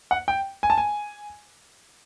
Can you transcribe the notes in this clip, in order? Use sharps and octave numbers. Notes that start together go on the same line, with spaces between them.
F#5
G5
G#5
A5
G#5